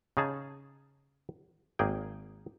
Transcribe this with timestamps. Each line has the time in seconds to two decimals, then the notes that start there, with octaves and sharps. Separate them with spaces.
0.17 C#3 D#4 G#4 A5
1.79 G#1 A#3 G#4 G5